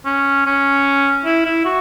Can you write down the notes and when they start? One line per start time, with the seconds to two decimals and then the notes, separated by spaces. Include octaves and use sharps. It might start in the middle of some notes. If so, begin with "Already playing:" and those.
0.05 C#4
0.46 C#4
1.25 E4
1.46 E4
1.65 F#4